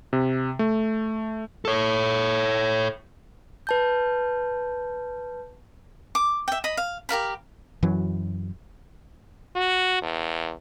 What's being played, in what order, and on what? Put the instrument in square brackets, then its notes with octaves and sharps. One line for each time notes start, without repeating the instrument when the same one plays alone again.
[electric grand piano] C3
A3
[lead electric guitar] A4 C#5
[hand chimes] B4 A5 G6
[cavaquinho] D6
E5 G5
D#5 B5
F5
G4 A#4 F5 B5
[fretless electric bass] F#2 E3 F#3
[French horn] F#4
E2